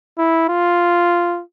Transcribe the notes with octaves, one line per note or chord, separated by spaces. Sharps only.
E4
F4